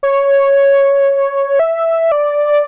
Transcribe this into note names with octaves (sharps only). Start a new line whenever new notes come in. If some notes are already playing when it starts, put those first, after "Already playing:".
C#5
E5
D5